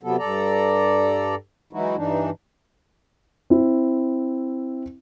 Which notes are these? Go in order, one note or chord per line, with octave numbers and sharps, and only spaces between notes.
C3 F#3 B3 A4
G2 A4 D5 A#5
E3 F#3 G#3 D#4 E4 F#4
G2 E3 D4 D#4
C4 E4